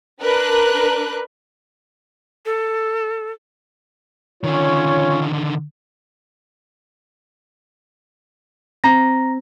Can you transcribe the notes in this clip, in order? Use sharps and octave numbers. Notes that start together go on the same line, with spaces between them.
D4 A#4 B4 F#6
A4
D3 D#3 C#4 F4 C#5
C4 A#5 A#6